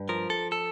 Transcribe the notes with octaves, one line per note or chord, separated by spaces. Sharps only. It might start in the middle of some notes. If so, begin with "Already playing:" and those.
Already playing: G2
F3 A#4
A4
A4